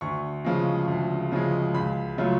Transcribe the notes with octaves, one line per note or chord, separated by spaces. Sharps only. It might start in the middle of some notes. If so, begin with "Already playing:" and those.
D2 C#6
C#3 F3 G#3
D2
C#3 F3 G#3
C#2 B5
C#3 F#3 A3 F4